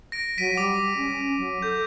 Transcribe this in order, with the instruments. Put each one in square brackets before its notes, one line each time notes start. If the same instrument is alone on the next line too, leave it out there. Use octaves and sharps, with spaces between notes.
[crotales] A#6 D7
[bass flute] F#3 [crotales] B6 D7 D#7
[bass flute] G3 [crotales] D6
[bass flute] C#4
F#3
[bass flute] A4 [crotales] G6